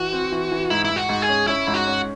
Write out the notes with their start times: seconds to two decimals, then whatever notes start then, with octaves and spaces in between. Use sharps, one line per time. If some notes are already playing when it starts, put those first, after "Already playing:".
Already playing: E3 F#4
0.12 C4
0.32 E3
0.52 E3
0.70 G#2 E4
0.85 E4
0.90 G#2
0.96 F#4
1.09 G#2
1.22 G#4
1.29 C#4
1.47 C#4 E4
1.67 G#2
1.74 F#4
1.87 C#4